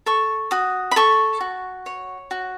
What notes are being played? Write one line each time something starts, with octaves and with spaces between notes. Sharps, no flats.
A4 C#6
F#4 D#6
B5
A4 C#6
F#4
C#5
F#4